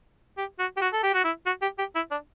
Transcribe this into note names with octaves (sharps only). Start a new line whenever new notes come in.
G4
F#4
G4
F#4
A4
G4
F#4
E4
F#4
G4
G4
E4
D4